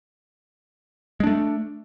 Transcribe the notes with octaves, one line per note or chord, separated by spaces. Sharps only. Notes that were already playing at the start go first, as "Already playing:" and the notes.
G#3 A3 D4